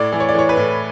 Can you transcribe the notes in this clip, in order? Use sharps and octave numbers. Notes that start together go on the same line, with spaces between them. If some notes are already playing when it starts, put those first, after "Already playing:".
Already playing: A2 D5
E3
C#5
D5
E3 C#5
B4
A2